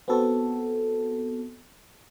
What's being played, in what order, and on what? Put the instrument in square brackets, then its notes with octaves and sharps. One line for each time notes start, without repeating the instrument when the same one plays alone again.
[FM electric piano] B3 C4 F#4 A4